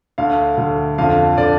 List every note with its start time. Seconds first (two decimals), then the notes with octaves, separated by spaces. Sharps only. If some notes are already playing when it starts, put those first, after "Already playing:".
0.18 D2 D3 F5
0.57 D2 D3
0.98 F2 D3 F5
1.38 D3 D5